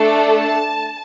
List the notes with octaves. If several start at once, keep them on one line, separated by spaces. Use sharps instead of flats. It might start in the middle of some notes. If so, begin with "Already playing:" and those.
Already playing: A3 D4 A4
A5